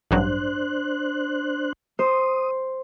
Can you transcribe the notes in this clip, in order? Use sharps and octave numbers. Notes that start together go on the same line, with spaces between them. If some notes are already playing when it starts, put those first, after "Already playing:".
A1 G2 F#3 D4 C5 F#6
C5 D#6